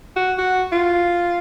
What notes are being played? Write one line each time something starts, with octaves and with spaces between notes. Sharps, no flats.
F#4
F#4
F4